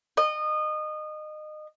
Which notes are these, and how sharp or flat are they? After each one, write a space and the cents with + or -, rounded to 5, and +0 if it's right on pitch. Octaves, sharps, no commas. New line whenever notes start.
D#5 -25